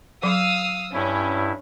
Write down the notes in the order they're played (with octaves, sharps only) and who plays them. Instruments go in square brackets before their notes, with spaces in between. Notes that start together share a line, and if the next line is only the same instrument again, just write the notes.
[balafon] F#3 [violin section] F5 D#6 E6
[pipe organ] G2 E4 [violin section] C#4